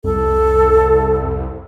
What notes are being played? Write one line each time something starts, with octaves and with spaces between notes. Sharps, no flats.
C2 F2 A4